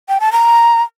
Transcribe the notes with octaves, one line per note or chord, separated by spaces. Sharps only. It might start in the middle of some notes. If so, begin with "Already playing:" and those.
G5
A5
A#5